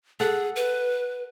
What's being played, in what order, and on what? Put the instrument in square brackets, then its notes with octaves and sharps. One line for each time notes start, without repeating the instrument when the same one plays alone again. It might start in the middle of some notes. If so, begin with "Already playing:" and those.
[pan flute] G#4 [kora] A4 F#5
[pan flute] B4